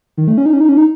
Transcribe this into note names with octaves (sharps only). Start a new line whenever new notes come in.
D#3
A3
C#4
D#4
C#4
D#4
C#4
D#4